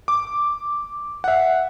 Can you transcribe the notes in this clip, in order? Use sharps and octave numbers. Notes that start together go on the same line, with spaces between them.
D6
E5 F#5